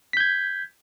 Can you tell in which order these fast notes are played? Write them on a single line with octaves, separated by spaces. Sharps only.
B6 G6 G#6